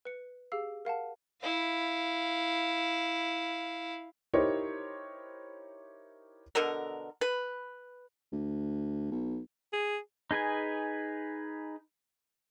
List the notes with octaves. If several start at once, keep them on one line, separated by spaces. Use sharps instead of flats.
B4 C#7
G4 G#4 F5 E6 C7
A#4 F5 F#5 A5
E4 F5
D#4 E4 G4 A#4 C5 C#5
B2 D3 A4 A#4
B4
D2
B1
G#4
D#4 G#4 B4 G#5